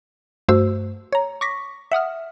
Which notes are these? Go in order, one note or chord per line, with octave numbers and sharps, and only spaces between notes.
G2 A3 F#4 C5 E6
C#5 A#5
C#6 D6 A#6 B6
E5 F#5 D#6 F6